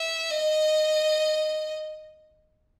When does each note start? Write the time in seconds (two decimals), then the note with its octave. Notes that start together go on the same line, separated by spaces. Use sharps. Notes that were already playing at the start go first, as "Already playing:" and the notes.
Already playing: E5
0.31 D#5